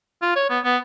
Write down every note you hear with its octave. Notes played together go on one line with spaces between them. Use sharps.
F4
C#5
B3
B3